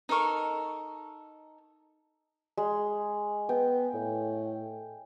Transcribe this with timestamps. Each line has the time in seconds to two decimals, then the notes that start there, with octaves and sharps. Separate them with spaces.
0.09 D#4 A4 A#4 C#6
2.57 G#3
3.49 B3 G5
3.94 A2